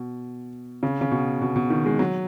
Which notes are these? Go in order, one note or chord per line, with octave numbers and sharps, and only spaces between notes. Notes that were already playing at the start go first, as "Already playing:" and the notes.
Already playing: B2
C#3
C#3
B2
B2
B2
D#3
G#3
F#3